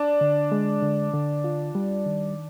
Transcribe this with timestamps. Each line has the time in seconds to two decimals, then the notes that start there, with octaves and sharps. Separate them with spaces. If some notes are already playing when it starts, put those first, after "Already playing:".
Already playing: D4
0.21 D3
0.52 G#3
0.82 D3
1.13 D3
1.44 F4
1.75 G3
2.06 D#3